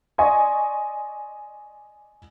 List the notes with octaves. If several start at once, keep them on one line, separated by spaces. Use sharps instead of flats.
D5 D#5 G#5 C6 C#6